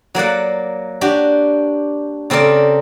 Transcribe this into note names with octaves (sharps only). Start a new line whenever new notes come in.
F#3 A#3 D5 F#5
D4 F#4 G4
C#3 C4 A4 A#4 D5